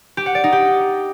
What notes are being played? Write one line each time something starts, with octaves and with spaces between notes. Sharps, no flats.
G4
F#5
D5
D#4
G4